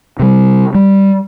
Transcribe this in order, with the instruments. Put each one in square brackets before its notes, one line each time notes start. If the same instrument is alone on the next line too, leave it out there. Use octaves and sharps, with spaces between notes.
[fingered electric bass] C3 G3
G3